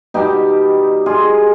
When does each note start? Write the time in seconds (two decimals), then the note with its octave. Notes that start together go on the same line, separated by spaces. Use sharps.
0.14 B2 G3 D#4 G4
1.06 F4 G#4